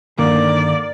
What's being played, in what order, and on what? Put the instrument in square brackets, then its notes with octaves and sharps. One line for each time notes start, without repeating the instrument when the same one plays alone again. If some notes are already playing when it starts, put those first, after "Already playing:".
[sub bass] G2 [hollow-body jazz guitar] D3 D#3 [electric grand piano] A#3 [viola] D5